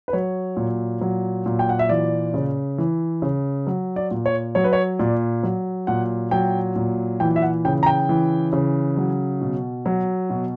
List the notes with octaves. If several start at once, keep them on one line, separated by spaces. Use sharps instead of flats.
B4
F#3 C#5
A#2
F#3
A#2
G5
F#5
E5
E3 D5
C#3
E3
C#3
F#3
D5
A#2
C#5
F#3 C#5
B4
C#5
A#2 D5
F#3
A#2 F#5
F#3 G5
A#2
E3 G5
E5
F#5
C#3 G5
A#5
G5
E3
C#3
F#3
B2
F#3
B2